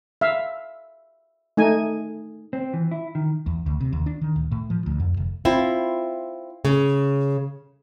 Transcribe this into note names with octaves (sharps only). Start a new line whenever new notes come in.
E5 F5
A3 D#4 G#5
C4
E3
E4
D#3
E2
D2
C3
D#2
D4
D#3
D1
A2
F3
D2
F2
F1
C4 E4 F4
C#3